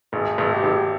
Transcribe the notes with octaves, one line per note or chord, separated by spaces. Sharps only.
G#1 G#4
G#1
G4
G#1